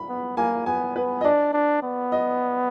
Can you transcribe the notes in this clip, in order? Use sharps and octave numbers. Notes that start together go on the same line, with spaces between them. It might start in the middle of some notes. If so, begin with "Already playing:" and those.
Already playing: B5
B3
A#3 G#5
B3 G#5
B3 B4
D#5
D4 D5
D4
B3
D#5